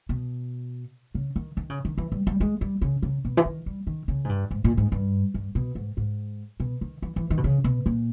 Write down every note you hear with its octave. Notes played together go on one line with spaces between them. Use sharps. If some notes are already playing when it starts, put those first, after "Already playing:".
B2
C#3
D#3
D#3
C#3
D#3
E3
G3
G3
G#3
G3
C#3
C#3
B2
E3
D#3
G3
D#3
C#3
G#2
G2
G#2
A#2
G#2
G2
G2
B2
G#2
G#2
B2
D#3
E3
E3
D#3
B2
C#3
B2
A#2